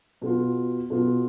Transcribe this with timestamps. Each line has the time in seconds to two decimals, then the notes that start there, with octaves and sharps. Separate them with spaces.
0.22 B2 B3 F4
0.90 B2 B3 F4